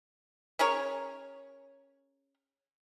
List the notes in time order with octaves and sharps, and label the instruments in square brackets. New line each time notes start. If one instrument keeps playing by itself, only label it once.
[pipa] C#4 G#4 A#4 C#5